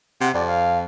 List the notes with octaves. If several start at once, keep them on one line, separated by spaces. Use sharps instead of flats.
C3 F#5
F2 D5
F5